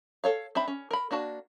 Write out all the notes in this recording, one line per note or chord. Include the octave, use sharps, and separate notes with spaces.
A4 C#5 F5
C4 D4 E5 B5
C#4
A#4 B5
A#3 D4 F#4 A5